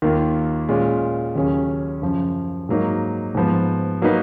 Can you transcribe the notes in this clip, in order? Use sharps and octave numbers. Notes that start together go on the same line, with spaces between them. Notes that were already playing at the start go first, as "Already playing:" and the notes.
D#2 D#3 A#3 F4
A#2 G#3 C#4 F4
D#2 C#3 F#3 C#4 G#4
F#2 C#3 F3
G#2 F#3 A#3 D#4
G#2 F3 B3
F#3 A#3 D#4 F#4 B4